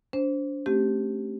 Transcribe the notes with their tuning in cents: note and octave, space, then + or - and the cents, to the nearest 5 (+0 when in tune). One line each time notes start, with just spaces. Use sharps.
D4 -35 C5 +0
A3 +0 C4 +35 G4 -10